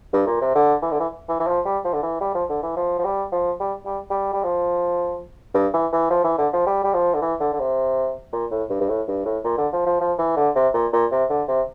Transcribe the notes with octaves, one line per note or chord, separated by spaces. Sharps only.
G2
A#2
C3
D3
E3
D3
E3
E3
E3
F3
G3
F3
D3
E3
G3
F3
D3
E3
F3
F3
G3
F3
G3
G3
G3
G3
F3
G2
E3
E3
F3
E3
D3
F3
G3
G3
F3
D3
E3
D3
D3
C3
A#2
A2
G2
G2
A2
G2
A2
A#2
D3
F3
F3
F3
E3
D3
C3
A#2
A#2
C3
D3
C3